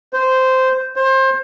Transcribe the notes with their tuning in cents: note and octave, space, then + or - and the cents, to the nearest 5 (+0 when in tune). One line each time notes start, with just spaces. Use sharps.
C5 -10
C5 +25